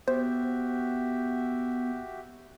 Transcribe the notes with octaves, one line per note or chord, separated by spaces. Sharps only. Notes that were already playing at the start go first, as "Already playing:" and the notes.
B3 F#4 G4 C5 E5